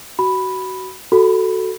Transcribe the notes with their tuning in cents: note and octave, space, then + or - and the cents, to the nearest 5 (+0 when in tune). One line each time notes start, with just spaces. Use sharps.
F#4 +20 B5 +0
F#4 +10 A4 +0 B5 +0